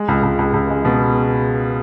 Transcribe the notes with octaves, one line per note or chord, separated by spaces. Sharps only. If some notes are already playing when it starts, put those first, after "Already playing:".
Already playing: G#3
C#2
C#2
C#2
C#2
G#3
B2